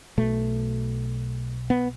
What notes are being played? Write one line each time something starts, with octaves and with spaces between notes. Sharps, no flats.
B1 B2 A3
B3